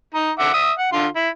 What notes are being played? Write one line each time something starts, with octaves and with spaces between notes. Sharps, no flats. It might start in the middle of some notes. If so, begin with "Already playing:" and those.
D#4
E5 F#5 D6
E5 D#6
F#5
D3 F4 C6
E4